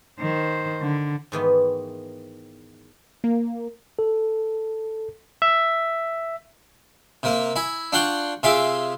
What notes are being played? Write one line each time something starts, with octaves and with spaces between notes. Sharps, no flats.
D#3 C5
D3
G#2 D#3 E3 B3
A#3
A4
E5
C3 A#3
E4 G#5
D4 F4 F#5 G5 C6 C#6
C3 F4 G#4 E5 C6 D6